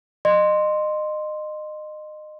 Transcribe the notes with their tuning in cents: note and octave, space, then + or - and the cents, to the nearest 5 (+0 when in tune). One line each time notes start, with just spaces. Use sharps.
D#5 -25 C6 +0